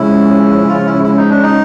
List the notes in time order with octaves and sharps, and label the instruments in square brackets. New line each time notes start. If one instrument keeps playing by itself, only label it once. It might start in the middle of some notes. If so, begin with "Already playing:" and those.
Already playing: [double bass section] C#3 F3 G#3 C#4 [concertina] E4
[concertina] F4
E4
E4
D#4
D4
D#4